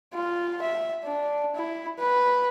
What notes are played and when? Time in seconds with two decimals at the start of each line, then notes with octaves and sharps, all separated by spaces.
0.14 F4
0.62 E5
1.04 D4
1.55 E4
1.99 B4